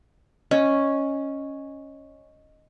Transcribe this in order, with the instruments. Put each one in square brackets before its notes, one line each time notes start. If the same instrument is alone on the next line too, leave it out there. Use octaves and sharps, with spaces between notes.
[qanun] C#4 [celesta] D#5